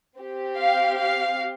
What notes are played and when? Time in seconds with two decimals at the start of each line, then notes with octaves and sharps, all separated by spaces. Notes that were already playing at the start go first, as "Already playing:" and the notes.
0.18 C4 G4
0.57 F5
0.96 F5